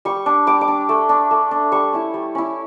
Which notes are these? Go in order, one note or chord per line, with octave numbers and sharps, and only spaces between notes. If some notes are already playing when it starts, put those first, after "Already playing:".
G3 C#6
D4
G3 D6
D6
D4
A3
D4
A3
D4
G3 C#6
C#4 E4
G3
C#4 E4